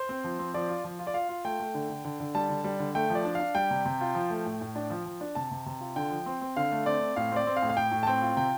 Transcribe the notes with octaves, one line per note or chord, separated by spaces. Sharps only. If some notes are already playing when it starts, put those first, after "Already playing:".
Already playing: C5
C4
F3
C4
F3 D5
F4
F3
F4
D5
F4 F5
F4
A3 G5
A3
D3
D3
D3
D3
G3 A5
D3
G3
D3
A3 G5
F3
D5
D4
F5
D4
G3 G5
C3
C3
F4
F3
A3
A2
A2
D4
F3
F3
D4
C3 A5
C3
C3
F4
D3 G5
F3
C4
C4
D3 F5
A3
C4 D5
C4
A2 F5
C4 D5
C4
F5
A2
F5
A2 G5
A2
A5
C4 G5
F4
C3 G5